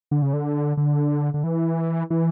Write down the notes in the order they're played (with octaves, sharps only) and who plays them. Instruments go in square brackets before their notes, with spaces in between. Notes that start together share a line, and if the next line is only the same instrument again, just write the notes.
[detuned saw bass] D3
C#3
D3
D3
D3
E3
E3